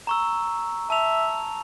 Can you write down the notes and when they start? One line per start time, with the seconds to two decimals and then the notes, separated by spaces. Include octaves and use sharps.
0.07 A#5 C#6 E6
0.90 E5 A5 F7